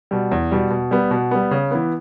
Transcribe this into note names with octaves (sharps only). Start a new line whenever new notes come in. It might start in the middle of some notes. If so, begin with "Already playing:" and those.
B2 G3
E2
B2 G3
B2
G3 B3
B2
G3 B3
C#3
E3 B3